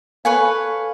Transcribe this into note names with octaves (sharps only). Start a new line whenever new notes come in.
A4 B4 C#5 F5 G#5